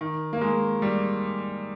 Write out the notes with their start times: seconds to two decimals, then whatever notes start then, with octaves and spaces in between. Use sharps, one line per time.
0.01 D#3
0.33 A#3
0.41 G#3
0.82 G3